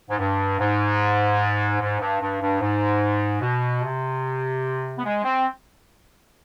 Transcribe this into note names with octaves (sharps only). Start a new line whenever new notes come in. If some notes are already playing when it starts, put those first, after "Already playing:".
G#2
G2
G#2
G#2
G2
G2
G2
G#2
B2
C3
B3
G#3
C4